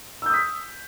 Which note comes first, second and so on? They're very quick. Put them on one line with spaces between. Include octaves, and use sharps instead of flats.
E6 G6 D#6 B6